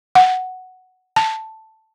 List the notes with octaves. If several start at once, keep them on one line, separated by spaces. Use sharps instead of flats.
F#5
A5